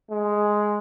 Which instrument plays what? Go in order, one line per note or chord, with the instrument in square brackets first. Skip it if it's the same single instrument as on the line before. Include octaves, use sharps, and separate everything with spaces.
[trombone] G#3